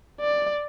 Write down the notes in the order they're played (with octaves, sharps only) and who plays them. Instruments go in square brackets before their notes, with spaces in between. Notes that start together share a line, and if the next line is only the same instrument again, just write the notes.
[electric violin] D5